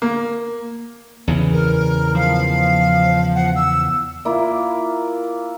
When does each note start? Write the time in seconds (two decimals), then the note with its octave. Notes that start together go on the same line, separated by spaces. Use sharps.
0.02 A#3
1.28 E2 C#3 E3
1.52 A#4
2.15 F3 F5
3.35 F#5
3.55 E6
4.25 A#3 E4 F4